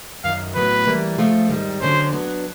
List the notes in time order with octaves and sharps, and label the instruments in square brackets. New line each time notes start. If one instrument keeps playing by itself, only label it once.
[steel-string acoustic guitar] F#2 D#3 F#3 [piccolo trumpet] F5
[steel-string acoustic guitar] A2 F#3 B3 [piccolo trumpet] B4
[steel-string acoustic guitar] E3 G3 A#3
C#3 F3 A3 C4 F4
G#2 D#3 G3
[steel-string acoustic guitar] D3 F#3 A#3 C#4 [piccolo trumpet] C5
[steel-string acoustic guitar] F#3 B3 D4